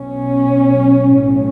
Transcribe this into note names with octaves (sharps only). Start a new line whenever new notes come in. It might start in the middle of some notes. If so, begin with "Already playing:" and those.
Already playing: B1 B2 C#4
B1 A2